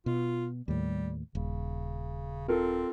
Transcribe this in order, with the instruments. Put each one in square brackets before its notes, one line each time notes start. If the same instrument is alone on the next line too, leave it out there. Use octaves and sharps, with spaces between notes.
[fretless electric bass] B2 [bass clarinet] F4
[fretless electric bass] D#2 A2 [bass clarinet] G3
[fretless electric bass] D#1 [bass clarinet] C#3
[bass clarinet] C4 [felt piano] F4 A4 A#4